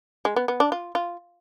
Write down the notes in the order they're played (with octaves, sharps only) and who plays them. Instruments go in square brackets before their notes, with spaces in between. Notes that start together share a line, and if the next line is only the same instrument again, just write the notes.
[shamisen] G#3
B3
B3
D4
F4
F4